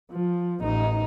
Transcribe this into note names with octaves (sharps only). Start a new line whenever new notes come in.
F3
A1 D#4